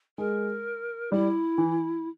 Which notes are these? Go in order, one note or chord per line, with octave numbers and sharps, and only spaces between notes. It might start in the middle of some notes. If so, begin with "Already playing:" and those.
G#3 A#4
G3 E4
E3